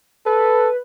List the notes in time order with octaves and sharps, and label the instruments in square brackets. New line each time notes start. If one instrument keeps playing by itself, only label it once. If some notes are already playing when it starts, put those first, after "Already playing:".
[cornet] A4 [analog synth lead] B4